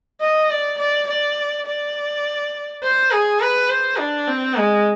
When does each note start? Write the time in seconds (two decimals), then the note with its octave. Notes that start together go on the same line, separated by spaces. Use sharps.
0.21 D#5
0.50 D5
0.79 D5
1.07 D5
1.66 D5
2.83 C5
3.12 G#4
3.41 B4
3.69 C5
3.99 D4
4.28 C4
4.56 G#3